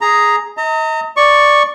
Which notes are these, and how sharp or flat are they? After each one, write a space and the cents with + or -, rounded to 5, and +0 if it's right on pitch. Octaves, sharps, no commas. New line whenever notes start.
G#4 +0 A#5 +0
D#5 +35 A#5 -35
D5 +0 C#6 +0